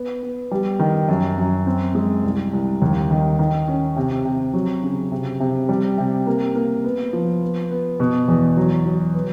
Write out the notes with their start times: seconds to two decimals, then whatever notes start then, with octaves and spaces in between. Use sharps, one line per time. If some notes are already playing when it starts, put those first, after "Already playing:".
Already playing: B3
0.23 B3
0.51 G3
0.79 D#3
1.09 F#2
1.38 F#2
1.67 C4
1.95 G#3
2.24 C2
2.53 C2
2.82 D#2
3.11 D#3
3.39 D#3
3.68 C#4
3.96 C3
4.25 C3
4.54 F#3
4.83 C#3
5.11 C3
5.40 C3
5.69 G3
5.98 C3
6.27 A#3
6.56 A#3
6.84 B3
7.13 F3
7.42 B3
7.71 B3
8.00 B2
8.28 E2
8.57 F#3
8.86 F#3
9.14 B3